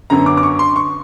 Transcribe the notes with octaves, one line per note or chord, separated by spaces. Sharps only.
F#2 D3 F#3 B3 A#5
D6
D6
C#6
C6
C#6